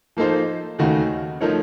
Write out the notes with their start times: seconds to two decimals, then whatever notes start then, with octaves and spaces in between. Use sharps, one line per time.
0.17 F3 A#3 D#4 A4 C5
0.79 D#2 C#3 A3 D#4 F#4
1.41 F3 A3 D#4 A#4 C#5